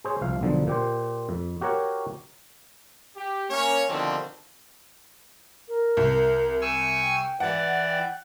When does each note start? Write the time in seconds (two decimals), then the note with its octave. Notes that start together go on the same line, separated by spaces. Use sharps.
0.04 G#4 C5 C#5
0.21 C2 F3 F5
0.41 B1 D3 F3
0.67 A#2 G4 C5
1.29 F2
1.61 F#4 G4 A#4 C#5 F#5
3.16 G4
3.49 A#3 C#4 C#5
3.88 B2 D3 D#3 F3 G3 C4
5.68 A#4
5.97 C2
6.61 G#5 C#6 E6
7.02 G5
7.40 E3 B4 D5 F#5
7.91 G5